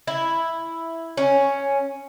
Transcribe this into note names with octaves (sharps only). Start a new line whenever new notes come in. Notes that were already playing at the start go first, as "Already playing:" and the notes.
E4
C#4